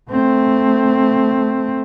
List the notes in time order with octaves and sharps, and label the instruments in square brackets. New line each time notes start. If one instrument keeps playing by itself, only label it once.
[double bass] A3 C4